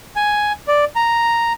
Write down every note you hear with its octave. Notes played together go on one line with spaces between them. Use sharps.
G#5
D5
A#5